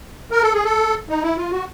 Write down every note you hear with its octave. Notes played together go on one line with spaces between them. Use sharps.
A#4
A4
G#4
A4
D#4
E4
F4
F#4